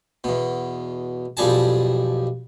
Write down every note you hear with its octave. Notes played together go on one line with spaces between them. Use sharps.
E2 B2
B1 F2 G3 G#4 A5